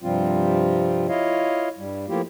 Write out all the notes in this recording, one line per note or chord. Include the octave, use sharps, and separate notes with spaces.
G2 C3 F3 G3 C4 F4
E4 F4 C#5 D#5 F5
G2 G3
F3 A3 A#3 E4 F4 G4